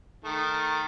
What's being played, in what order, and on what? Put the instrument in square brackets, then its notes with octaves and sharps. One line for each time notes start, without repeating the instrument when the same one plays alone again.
[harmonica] D#3 A3